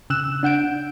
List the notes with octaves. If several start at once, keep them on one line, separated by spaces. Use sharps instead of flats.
C#3 E6 F#6 E7
D4 F#5 G6 D7